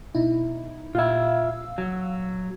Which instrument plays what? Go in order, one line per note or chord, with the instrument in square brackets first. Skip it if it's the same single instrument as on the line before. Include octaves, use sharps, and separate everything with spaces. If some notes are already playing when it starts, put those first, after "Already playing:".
[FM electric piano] B2 D#4 E4
[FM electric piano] A#2 F5 E6 [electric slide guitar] F4 E5
[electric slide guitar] F#3